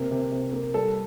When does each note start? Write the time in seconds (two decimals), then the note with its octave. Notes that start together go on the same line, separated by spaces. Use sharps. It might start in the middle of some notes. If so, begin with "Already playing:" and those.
Already playing: C3 A#3
0.11 C3
0.31 C3
0.53 A#3
0.74 G3 A4